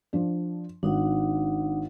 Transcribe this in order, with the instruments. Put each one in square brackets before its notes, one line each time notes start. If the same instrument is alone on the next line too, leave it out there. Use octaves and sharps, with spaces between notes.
[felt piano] F3 D4
[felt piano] G#1 [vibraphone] D4 D#4 F#5